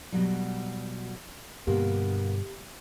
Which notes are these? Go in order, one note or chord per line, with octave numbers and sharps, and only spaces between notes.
B2 F#3 G3
G2 B2 D3 A#3 B3 G4